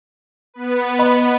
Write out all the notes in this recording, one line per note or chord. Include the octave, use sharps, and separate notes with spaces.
B3 B4
D#5 B5